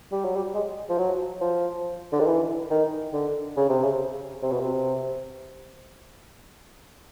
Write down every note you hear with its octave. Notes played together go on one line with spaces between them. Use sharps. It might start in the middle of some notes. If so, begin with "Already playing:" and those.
G3
F#3
G3
G#3
F3
F#3
F3
D3
D#3
E3
D#3
D3
C#3
C3
C#3
C3
B2
C3